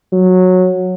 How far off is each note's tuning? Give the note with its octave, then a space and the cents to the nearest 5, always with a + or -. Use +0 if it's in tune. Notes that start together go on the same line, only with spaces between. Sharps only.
F#3 -15